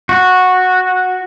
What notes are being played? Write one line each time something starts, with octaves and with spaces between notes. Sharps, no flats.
F#4